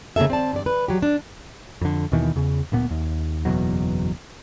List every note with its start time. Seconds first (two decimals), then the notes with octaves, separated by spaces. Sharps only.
0.16 C#3 A#3 G#4 A4 E5
0.30 C4 D5 A5
0.53 G2 D5
0.66 B4
0.88 F#3 G4
1.02 D4
1.81 F2 D3
2.12 D#2 B2 D#3 E3
2.36 E2 C#3
2.72 D1 A#2 B3
2.90 D#2
3.45 F#1 E2 B2 F#3